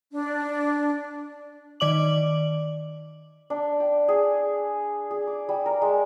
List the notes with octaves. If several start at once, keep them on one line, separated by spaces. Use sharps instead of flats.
D4
D#3 D5 D6 F#7
D4
G5
G#4
G#4
D6
G3
A#4
G#3